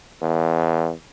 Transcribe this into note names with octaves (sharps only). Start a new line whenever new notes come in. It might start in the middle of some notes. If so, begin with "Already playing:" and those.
E2